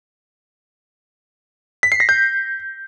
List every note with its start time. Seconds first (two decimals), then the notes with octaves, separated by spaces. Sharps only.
1.83 B6
1.92 C7
2.00 A#6
2.09 G6